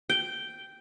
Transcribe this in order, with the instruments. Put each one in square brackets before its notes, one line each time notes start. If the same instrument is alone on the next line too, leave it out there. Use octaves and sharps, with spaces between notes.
[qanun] G5